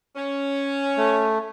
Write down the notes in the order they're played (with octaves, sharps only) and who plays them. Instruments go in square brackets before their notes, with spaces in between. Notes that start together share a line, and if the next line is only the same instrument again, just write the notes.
[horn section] C#4
[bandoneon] A3